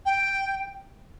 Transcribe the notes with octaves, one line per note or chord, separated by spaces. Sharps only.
G5